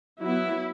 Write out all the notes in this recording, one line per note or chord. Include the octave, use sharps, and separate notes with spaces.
F#3 B3 E4